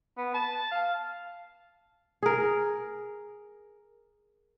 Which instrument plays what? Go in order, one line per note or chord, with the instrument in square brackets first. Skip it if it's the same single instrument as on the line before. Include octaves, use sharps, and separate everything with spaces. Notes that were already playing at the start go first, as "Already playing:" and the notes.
[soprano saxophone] B3
A5
F5
[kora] G#4 A#4